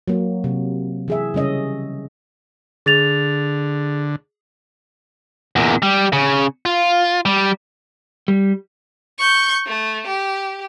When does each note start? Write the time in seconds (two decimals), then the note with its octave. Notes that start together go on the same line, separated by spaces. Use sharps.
0.08 F#3 A#3
0.44 C3
1.08 E3 G#4 E5
1.34 C#3 G3 C#4 D#5
2.86 D3 G#4 A6 F7
5.56 E2 A#2
5.82 G3
6.13 C#3
6.65 F4
7.25 G3
8.28 G3
9.19 C#6 G6
9.67 A3
10.07 G4